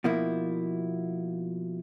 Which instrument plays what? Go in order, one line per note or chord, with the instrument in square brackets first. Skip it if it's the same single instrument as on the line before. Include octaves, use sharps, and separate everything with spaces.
[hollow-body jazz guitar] B2 F3 A#3 E4